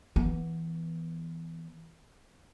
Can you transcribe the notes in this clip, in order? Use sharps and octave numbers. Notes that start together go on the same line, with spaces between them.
E3 B3